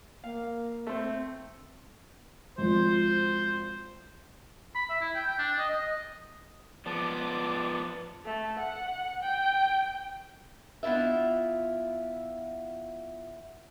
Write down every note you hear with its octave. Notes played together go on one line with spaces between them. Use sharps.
A#3 F5
A3 C4
G#1 F3 C5
B5
E5
E4
G5
G5
D4
D#5
D#5
F3 B3 D5 A5 D6
A3
F#5
G5
B3 D4 E4 F4 E5